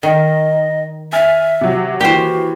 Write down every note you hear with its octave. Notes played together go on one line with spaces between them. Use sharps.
D#3 D#5
E5 G#5 F6 A6
C3 F#3
E3 A#3 F#4 G4 C5